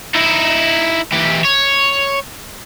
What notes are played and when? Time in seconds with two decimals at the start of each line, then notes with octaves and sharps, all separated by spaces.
0.15 D#4 E4
1.12 E3 G4
1.45 C#5